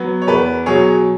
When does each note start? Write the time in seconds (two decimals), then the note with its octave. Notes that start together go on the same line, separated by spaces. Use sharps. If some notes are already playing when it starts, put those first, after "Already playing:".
Already playing: F#3 B3
0.22 C#5
0.27 E2 B4
0.66 B2 F#3 G#4 C#5